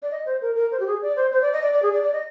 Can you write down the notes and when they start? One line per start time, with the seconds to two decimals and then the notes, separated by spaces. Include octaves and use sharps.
0.02 D5
0.11 D#5
0.26 C5
0.41 A#4
0.55 A#4
0.71 C5
0.79 G4
0.87 G#4
1.02 D5
1.16 C5
1.32 C5
1.41 D5
1.53 D#5
1.62 D5
1.73 D5
1.82 G#4
1.93 D5
2.03 D5
2.12 D#5